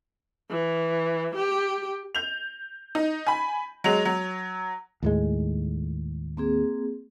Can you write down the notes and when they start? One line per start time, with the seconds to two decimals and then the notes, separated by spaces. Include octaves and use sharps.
0.51 E3
1.36 G4
2.15 G6 F7
2.95 D#4
3.27 G#5 B5
3.84 F#3 G#3 F7
4.05 F#3
5.03 D#2 A2 G#3
6.37 A#3 C4 G#4